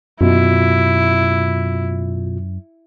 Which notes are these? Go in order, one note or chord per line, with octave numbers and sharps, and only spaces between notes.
F#2 B2 E4 F4